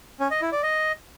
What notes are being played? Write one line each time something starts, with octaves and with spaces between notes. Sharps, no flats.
C#4
D#5
E4
D5
D#5